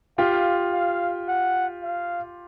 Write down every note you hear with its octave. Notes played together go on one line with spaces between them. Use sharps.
F4 G4 F5
F5
F#5
F5